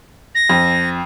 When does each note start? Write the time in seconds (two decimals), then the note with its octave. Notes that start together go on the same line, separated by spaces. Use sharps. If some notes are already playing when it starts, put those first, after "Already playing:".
0.35 A#6
0.50 F2